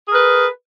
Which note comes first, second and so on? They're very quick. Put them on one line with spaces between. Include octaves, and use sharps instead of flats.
G#4 A#4 B4